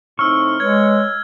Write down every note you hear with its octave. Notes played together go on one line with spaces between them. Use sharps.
A2 C4 D#4 C#6 E6 F6
G#3 B4 C#5 G#6